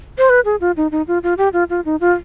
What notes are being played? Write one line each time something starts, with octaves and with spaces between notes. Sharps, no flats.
C5
B4
G#4
F4
D#4
D#4
F4
F4
G4
F4
F4
D#4
F4